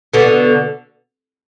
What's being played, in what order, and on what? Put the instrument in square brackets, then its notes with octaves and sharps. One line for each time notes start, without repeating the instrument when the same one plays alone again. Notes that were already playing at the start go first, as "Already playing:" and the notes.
[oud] B2 D3